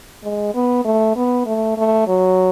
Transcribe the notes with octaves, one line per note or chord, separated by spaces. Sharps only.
G#3
B3
A3
B3
A3
A3
F#3